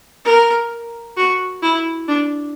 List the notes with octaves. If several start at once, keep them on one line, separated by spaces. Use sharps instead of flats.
A#4
F#4
E4
D4